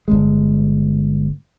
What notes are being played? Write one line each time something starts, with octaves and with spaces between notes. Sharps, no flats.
G1 E2 G#3